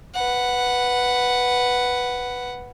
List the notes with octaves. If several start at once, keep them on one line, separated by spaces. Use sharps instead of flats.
B4 F#5